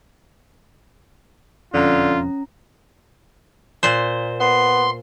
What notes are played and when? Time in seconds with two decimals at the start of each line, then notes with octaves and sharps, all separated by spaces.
1.74 E1 F2 D3 C#4 F4 A#5
3.83 A#2 C5
4.40 B3 C6